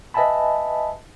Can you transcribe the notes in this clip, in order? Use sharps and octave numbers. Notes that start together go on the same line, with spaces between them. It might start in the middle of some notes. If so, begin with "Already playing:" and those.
B4 D#5 E5 G#5 A5 B5